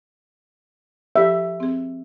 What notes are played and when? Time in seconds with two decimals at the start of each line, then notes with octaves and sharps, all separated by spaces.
1.16 F3 G4 D5 E5
1.60 C4 G#4